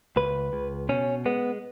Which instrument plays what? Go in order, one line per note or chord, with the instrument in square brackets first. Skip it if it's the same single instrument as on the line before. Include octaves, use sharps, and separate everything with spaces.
[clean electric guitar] C#2 B4
C#2
B2 C#4
G#3 B3